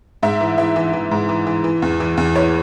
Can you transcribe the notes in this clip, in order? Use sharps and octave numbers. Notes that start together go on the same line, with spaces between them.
G#2 E5
E3
E3 E5
E3
E3
G#2
E3
E3
E3
E2
E3
E2
E3 C#5